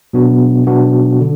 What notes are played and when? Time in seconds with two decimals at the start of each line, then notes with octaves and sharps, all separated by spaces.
0.13 B2 F#3 B3 D4 F#4
0.67 B2 F#3 B3 D4 F#4
1.21 D3